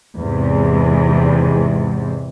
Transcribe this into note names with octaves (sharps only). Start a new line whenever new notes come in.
E2 G#2 C3